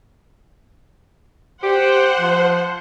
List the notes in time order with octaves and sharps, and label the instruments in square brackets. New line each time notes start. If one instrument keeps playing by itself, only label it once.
[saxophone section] G4 [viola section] C5 F#5
[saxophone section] F3